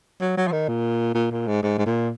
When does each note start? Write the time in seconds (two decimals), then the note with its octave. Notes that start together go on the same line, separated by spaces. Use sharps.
0.21 F#3
0.37 F#3
0.47 F3
0.52 D#3
0.68 A#2
1.15 A#2
1.31 A#2
1.47 G#2
1.63 G#2
1.78 G#2
1.86 A#2